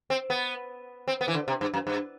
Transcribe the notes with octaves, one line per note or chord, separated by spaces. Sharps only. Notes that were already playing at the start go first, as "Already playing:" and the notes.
C4
B3
C4
B3
E3
D3
C3
G2
F#2
G2